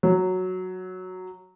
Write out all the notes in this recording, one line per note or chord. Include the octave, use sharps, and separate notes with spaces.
F#3